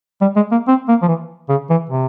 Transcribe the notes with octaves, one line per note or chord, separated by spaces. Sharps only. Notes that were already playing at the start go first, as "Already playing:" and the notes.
G3
G#3
A#3
C4
A#3
F3
E3
C#3
E3
C3